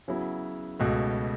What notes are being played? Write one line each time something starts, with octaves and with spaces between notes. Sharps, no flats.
C#3 F#3 B3 E4
C#2 B2 A3